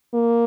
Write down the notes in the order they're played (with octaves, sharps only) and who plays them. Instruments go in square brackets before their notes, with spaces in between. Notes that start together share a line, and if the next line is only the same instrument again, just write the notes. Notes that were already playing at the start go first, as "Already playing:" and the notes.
[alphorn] A#3